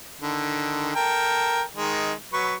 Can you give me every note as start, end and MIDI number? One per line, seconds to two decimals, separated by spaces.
0.21 0.95 50
0.21 0.95 51
0.95 1.62 69
0.95 1.62 70
0.95 1.62 79
1.75 2.13 51
1.75 2.13 56
2.33 2.54 54
2.33 2.54 71
2.33 2.54 85